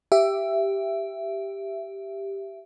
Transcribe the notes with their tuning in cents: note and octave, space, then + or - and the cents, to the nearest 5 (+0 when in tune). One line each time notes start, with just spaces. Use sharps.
G4 +0 E5 +15